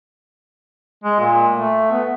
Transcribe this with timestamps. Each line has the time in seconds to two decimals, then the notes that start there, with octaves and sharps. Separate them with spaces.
1.04 G#3
1.20 A#2
1.55 A3
1.91 B3